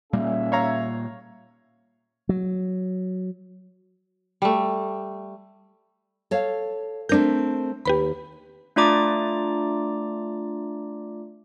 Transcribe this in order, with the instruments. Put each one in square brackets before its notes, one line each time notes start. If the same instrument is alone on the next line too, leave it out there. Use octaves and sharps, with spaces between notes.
[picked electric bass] A#2 G3 A#3 [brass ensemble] C#4 G#4 E5
[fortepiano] C#5 F5 A#5
[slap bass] F#3
[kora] G3 A3
[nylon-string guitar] A4 C#5 F5
[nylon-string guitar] A3 C4 A#4 [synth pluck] D4 G6
[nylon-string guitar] D#2 [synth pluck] G4 B4 B5
[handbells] A3 D4 F4 D5 A#5 D6